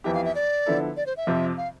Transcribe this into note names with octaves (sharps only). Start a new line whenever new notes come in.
F2 E3 B3 E4 G4 E5
F5
E5
D5
D3 F3 B3 E4 A4
D5
C5
E5
F2 C3 F3 C4
F5